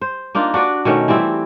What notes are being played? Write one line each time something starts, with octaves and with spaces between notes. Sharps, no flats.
C5
A#3 D4 D#4 F4
D4 F#4 B4 D5
B2 D#3 A3 C#4
E3 G3 C4 E4